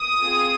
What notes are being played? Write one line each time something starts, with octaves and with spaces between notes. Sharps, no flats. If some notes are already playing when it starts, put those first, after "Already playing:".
Already playing: D#6
C4 F4 G#4